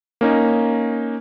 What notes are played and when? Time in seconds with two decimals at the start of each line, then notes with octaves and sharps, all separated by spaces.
0.21 A#3 C#4 D#4